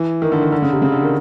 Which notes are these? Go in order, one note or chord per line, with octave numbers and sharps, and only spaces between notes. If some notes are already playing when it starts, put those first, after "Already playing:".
Already playing: E3
D#3
D3
D#3
D3
C#3
C3
C#3
D3
D#3